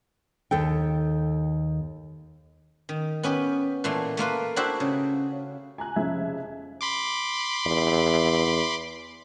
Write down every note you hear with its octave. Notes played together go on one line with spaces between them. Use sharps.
D#2 A4 G5
D#3
B3 C#4 G4 B4
A#2 E3 A3 C6
A3 A#3 F4 B4
D4 E4 F#4 G4 C5 E5
C#3
G#5 A#5 F#6
F1 C#3 F3 E5 G#6
B5 C6 D6
E2